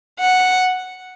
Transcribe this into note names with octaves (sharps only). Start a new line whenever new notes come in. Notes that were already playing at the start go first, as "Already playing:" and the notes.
F#5